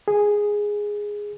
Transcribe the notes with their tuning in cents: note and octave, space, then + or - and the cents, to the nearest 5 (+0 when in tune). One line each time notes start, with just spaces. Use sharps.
G#4 -5